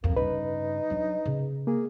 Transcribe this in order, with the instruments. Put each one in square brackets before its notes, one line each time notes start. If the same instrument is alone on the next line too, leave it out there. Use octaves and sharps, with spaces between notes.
[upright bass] F2 [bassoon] A#3
[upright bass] G2 C#3 [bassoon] D#4 [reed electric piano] B4
[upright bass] F#3 D4
C#3
[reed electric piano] A#3 [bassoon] G#4